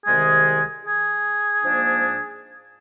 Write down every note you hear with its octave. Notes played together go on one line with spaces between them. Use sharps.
C2 C3 D#3 G#3 G#4
G#4
G#2 F3 A#3 D4